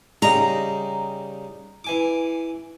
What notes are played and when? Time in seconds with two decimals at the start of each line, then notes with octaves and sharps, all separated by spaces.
0.22 C#3 G3 D#4 A#5
1.84 E3 G#5 D6